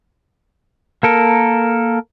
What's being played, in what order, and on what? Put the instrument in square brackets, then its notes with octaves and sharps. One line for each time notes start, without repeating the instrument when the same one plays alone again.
[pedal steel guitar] A#3 A4 A#4